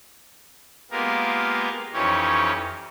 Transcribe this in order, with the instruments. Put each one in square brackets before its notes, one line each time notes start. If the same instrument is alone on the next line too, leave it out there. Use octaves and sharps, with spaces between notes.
[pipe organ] G#3 A#3 B3 F4 G4 A#4
F2 E3 C#4 D#4 G4 C#5